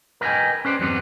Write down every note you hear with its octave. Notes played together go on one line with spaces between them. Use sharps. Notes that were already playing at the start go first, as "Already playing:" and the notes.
A#4 B4 D#5 F5 G5 G#5
C#4 B4 C5 D5
E2 G2 F#3 G3 B3 C4